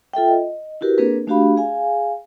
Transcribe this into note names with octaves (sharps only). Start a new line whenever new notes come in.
F4 A4 E5 G5
D#5
E4 F#4 G4 A#4 B4
A#3 C4 D4 G#4 A#4 B4
A3 D4 F#4 G4 F5 B5
G#4 F5 G#5